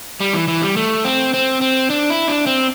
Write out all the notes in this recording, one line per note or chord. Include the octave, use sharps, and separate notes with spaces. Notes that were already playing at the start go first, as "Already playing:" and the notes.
G3
E3
E3
G3
A3
C4
C4
C4
D4
E4
D4
C4